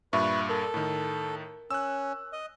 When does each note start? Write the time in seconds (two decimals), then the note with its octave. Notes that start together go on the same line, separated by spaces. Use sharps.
0.13 G2 A#2 B4 E5 C#6
0.49 A4 A#4
0.74 A2 D#3
1.71 C#4 E6 F#6
2.33 D#5